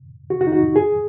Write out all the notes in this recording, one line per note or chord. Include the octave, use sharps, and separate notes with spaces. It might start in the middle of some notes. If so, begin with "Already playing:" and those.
F#4
F#4
D#4
F#4
G#4